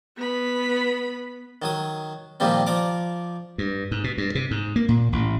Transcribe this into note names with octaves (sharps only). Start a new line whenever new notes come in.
B3 B5
D#3 F#3 D#6
A#2 D#3 F3 G3 C4
F3 D5 A#5 D6
G2
G#2
B2
G2
C3
G#2
A#3
A#2
A1